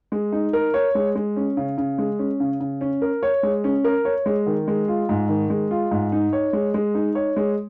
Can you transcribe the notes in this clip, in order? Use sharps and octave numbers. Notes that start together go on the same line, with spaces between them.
G#3
D#4
A#4
C#5
G#3
G#3
C#4
C#3
C#3
G#3
C#4
C#3
C#3
C#4
A#4
C#5
G#3
C#4
A#4
C#5
G#3
D#3
G#3
F4
G#2
D#3
G#3
F4
G#2
D#4
C#5
G#3
G#3
D#4
C#5
G#3